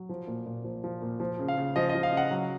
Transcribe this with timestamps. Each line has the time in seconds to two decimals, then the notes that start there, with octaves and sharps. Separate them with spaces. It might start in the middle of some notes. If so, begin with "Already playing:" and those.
Already playing: F#3
0.09 F3
0.27 A#2
0.46 A#2
0.64 F3
0.84 F3
1.02 A#2
1.20 F3
1.39 C#3
1.48 F5
1.58 C#3
1.76 F3 D#5
1.89 D#5
1.95 F3
2.03 F5
2.13 C#3 F#5
2.31 F#3